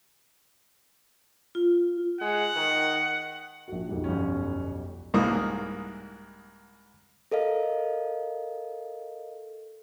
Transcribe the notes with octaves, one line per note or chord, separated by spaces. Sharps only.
F4
G#3 F#5
D#3
A#1 F#4
B1 F2 G3
G1 C#4
C2 G#2 E3 A#3 D#6
A4 A#4 D#5 F5